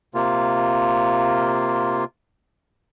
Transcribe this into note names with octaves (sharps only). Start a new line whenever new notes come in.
C3 A#3 F4